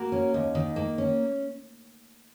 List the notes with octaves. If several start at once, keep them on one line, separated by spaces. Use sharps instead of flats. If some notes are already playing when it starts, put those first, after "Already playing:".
Already playing: A#3 F#4 A#4
C#4
D#2
D#3
A#3
C#4